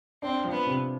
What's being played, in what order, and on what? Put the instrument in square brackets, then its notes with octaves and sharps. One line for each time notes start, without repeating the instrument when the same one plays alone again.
[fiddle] C4 [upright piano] D4
[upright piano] F3
[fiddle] B3
[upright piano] C3